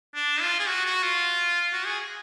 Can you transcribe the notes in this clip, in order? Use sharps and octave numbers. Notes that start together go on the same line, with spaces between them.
D4
F4
G#4
F#4
F#4
F4
F#4
G#4